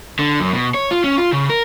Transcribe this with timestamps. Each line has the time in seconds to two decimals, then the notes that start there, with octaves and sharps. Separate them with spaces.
0.19 D3
0.40 F#2
0.53 B2
0.74 C#5
0.91 F4
1.04 C#4
1.18 F4
1.32 C#3
1.50 A#4